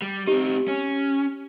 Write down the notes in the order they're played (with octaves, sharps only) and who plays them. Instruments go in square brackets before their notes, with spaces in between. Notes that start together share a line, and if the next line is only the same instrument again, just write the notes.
[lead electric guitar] G3
[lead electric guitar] C4 D#4 [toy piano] G4
[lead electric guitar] C#4